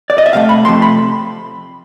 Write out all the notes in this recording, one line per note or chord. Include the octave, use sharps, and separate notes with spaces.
D5
D#5
E5
C3 F3 A3 F5
B5
C3 F3 A3 C6
B5